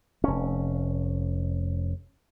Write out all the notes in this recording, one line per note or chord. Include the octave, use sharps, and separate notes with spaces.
F1 C#4